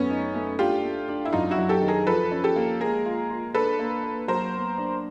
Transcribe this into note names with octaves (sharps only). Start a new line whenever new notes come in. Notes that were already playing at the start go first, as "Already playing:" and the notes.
Already playing: F#2 A3 B3 C#4
D#4
A3
D4 F4 G4
A3
D4
E4
F#2 D#4 F4
E4 F#4
F#3
G4 A4
D#3
G#4 A#4
F3 A4 B4
C#4
G4 A4
A#3
G#3 G#4 A#4
F4
F4
D4 A4 B4
A#3
A#3
F#3 A#4 C5
B3
D4